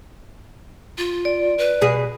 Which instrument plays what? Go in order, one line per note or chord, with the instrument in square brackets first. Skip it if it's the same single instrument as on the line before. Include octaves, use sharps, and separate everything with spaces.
[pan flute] F4
[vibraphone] D5
[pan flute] B4
[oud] B2 G#4